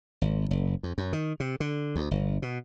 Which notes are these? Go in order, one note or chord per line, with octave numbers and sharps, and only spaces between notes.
G#1
F#1
F2
F#2
D#3
C3
D3
D2
G1
B2